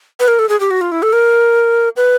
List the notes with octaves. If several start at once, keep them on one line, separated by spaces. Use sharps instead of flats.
B4
A#4
A4
G#4
G4
F#4
F4
E4
A4
A#4
B4